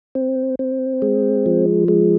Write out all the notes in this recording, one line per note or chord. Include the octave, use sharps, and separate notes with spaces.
C4
C4
G#3
F3
G#3